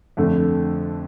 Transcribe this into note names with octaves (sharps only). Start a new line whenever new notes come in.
F2 D3 A3